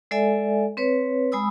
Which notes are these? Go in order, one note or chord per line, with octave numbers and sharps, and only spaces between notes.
G#3 A4 D5 E5 G#5
C4 B4 C#5
G#3 G#5 B5 D#6 E6